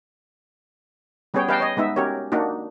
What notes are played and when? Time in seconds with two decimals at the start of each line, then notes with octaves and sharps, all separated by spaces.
1.34 G3 B3 C#4 G#4 C#5 G5
1.48 G4 B4 D#5 F5 G5 A5
1.60 C#5 D#5
1.77 G#3 B3 D#4 E5
1.96 C#4 F#4 G4 A#4 C#5
2.32 A#3 D4 D#4 F#4